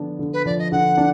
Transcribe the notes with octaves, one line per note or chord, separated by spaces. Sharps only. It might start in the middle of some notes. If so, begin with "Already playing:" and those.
Already playing: D3 F3 B3 D4
D3
B4
F3 D5
D#5
D3 F#5
D4